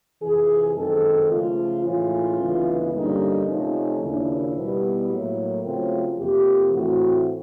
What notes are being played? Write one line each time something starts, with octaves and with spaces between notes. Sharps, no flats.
F2 C3 E3 G#4
F#2 D#3 G#3 C4 A4
C#3 F3 A3 F4
A2 E3 G#3 C#4 F4
D2 C#3 E3 G#3 B3
G2 D3 G3 A#3 C#4 D#4
C3 F3 A3 C#4 D#4
D#2 C#3 F3 A#3 D4 E4
B2 G3 B3
A2 F#3 A#3
C#3 F#3 A3 C4 F4
F2 C3 F3 A#3 G4
A2 E3 A3 C4 F#4